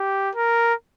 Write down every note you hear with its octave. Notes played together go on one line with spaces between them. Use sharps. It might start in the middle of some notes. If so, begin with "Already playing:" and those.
Already playing: G4
A#4